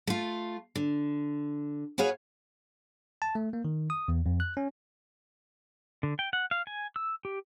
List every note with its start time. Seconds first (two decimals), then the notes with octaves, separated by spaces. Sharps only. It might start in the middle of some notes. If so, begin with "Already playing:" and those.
0.07 A3 F4
0.75 D3
1.98 F#4 G#4 B4 C#5 F5
3.22 A5
3.35 A3
3.53 A#3
3.65 D#3
3.90 D#6
4.08 E2
4.26 F2
4.40 F#6
4.57 C#4
6.03 D3
6.19 G5
6.33 F#5
6.51 F5
6.67 G#5
6.96 E6
7.25 G4